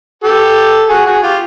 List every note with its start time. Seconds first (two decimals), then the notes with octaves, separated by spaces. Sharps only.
0.24 G4 A4
0.89 F#4 G#4
1.06 F#4 G#4
1.22 F4 G4